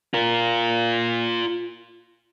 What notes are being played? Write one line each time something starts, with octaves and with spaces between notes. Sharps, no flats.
F4 A#4